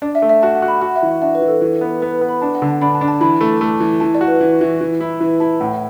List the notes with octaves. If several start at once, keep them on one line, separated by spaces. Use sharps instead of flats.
D4 D5
E5
A3
E5
F#4 A5
F#5
F#4
B5
F#4 F#5
E5
E3
F#5
D4 E5
B4
E3
A4
E3
B3
B3 B4
B4
B3
B5
D4 A5
F#5
D3
A5
D4 B5
A5
D4
A5
E3 B5
A3
A3
E3
E3 A5
D5
F#4
B4
E3
E3
E3
E4
E3 B4
E4 A5
A2 F#5